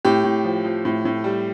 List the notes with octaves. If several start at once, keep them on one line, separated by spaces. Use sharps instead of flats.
A2 G4
A2
F3
F3
A2
A2
G3